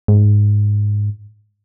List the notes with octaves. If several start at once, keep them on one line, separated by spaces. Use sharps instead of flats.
G#2